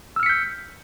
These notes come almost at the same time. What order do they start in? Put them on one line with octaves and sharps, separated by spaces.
E6 F6 C#7 B6 G6